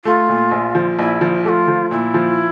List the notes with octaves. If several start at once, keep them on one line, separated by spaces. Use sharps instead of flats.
A3 F4
A#2
A#1
F3
A#1 E4
F3
A3 F4 G4
F3
A#2 E4
F3